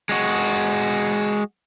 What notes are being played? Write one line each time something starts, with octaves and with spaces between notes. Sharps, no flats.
G#3 F#4